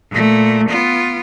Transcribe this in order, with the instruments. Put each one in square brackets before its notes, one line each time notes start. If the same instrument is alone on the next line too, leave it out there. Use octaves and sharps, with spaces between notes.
[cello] A#2 A3
B3 F4